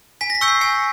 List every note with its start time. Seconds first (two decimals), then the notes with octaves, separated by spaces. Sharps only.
0.21 G#5 B6
0.30 A#6
0.35 B6
0.41 C#6 E6 G6 C#7
0.48 C7
0.61 G#5 C#7